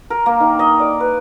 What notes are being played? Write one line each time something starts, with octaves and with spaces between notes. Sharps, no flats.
A#4
A#3
D#3
D#5
D5
B4